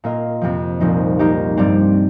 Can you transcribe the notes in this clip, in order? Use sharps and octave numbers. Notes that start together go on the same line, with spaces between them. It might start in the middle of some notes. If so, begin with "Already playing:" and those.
A#2 A#3 F4 D#5
F2 C3 F3
C2 A#2 F3 D#4 C5
F3 A#3 D#4 G4
G2 G3 C4 G4